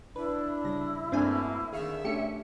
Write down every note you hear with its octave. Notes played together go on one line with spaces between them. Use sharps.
D4 E4 B4
C#3 G3 A#6
G2 B2 A3 A#3 C4 D4 G#5
D3 D#3 G#4 E5 F5 C#6
A#1 A3 C#4 D4 G4 C#7